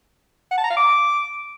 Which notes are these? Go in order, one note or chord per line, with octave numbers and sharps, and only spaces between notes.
F#5
A5
A#5
F5
D6